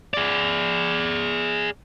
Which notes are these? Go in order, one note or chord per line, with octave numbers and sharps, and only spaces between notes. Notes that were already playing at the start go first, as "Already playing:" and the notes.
G#4 D5